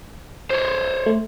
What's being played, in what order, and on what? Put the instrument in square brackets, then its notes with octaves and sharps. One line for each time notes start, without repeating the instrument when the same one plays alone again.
[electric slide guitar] C5 C#5
[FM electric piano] A3